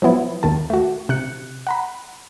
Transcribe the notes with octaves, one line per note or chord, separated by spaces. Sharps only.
F3 F#3 B3 E4
D#2 D#3 A5
A3 F#4
C3 F#6 C#7
F#5 A#5 B5